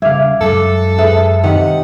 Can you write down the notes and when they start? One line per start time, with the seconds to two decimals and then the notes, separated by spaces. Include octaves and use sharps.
0.02 C#3 G3 E5 F5 D6 G#6
0.41 F#2 F#3 G#3 A4 D6 F#6
0.98 G#4 B4 E5
1.43 C3 D#3 G4 D#5 F#5